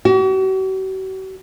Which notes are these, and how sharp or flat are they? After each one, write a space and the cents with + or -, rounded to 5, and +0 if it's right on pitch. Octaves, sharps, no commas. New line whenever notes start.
F#4 +45